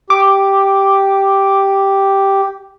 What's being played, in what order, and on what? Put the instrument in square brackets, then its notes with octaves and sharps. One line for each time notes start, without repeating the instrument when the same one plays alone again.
[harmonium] G4 [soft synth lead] D6